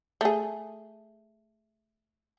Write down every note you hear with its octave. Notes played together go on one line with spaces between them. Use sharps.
A3 G#4